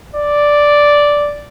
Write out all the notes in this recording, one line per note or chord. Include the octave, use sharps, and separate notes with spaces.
D5